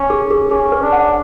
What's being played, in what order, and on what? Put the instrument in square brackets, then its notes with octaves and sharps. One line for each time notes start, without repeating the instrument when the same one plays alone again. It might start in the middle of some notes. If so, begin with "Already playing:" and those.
Already playing: [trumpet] C#4
[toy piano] G#4
G#4
[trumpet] C#4 [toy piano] G#4
[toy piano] B4
[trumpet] D4
[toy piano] F#5